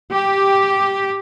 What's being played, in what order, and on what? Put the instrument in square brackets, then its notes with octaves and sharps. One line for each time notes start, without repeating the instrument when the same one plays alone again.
[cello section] G4